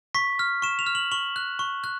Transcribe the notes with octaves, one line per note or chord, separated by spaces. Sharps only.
C#6 B6
F6
C#6 E7
F7
F6
F#7
C#6 F#7
F#6
C#6
F#6